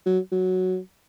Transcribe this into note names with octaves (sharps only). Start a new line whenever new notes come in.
F#3
F#3